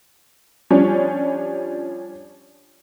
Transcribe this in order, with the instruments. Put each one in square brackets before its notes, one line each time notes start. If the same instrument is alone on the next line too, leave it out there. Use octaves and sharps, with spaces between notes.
[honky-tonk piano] F3 G3 C#4 D4